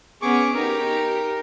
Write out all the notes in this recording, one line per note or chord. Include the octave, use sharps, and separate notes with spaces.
B3 C#4 G#4 C#6 D6
D#4 G4 A#4